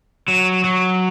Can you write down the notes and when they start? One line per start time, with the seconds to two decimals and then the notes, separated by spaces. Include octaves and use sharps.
0.28 F#3
0.64 F#3